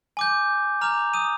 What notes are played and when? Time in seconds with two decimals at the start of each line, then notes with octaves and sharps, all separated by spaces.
0.17 G#5 D6 G6
0.81 A#5 D6 F6 G6 F7
1.14 D#6 D#7